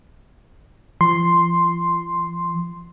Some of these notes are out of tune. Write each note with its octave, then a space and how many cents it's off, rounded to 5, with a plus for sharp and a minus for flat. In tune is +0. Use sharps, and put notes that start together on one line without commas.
F3 -35 C6 +0